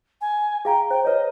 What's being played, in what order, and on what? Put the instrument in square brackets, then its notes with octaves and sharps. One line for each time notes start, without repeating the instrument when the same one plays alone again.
[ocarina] G#5
[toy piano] G#4 F5 A#5 [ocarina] G5
[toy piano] C5 [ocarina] G5
[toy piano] B4 C#5 [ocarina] D#5